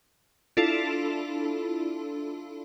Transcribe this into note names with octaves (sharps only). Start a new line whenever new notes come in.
D4 E4 F4 A4